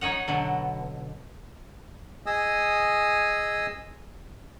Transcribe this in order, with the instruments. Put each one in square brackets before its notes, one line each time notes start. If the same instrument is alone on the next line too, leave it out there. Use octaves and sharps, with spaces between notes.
[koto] D#4 C#5 D#5 F#5
B2 D3 F#3
[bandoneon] G#4 D#5 G#5 D#6 E6